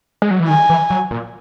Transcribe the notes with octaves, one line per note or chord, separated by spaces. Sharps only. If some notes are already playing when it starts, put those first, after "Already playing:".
G#3
F#3
E3
D#3 G#5
E3
F#3
A#2